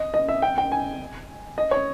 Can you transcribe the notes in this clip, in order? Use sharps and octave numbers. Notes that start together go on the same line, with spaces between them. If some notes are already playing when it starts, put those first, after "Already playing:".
Already playing: D#5
D#5
E5
G5
G5
G#5
D#5
C#5